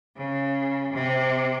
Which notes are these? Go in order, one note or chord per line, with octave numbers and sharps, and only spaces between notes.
C#3
C3